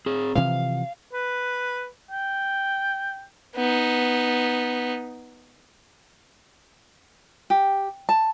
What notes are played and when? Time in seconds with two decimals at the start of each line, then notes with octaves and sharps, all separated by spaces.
0.06 C4 G#4
0.35 C3 E3 F3 F5
1.13 B4
2.11 G5
3.55 B3 D#4
7.50 G4
8.09 A5